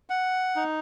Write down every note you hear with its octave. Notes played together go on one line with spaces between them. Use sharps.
F#5
D#4